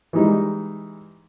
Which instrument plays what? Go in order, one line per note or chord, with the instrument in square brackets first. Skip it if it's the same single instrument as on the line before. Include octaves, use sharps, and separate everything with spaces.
[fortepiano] E3 G3 G#3 D#4